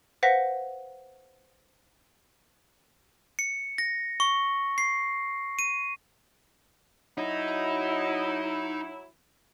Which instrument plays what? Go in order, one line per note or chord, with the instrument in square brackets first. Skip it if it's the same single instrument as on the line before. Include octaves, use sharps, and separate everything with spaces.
[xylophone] B4 C5 F5 F#5 A#6 B6
[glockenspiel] C#7
A#6
C#6
C7
D#7
[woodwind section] F#3 E4 [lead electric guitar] D#4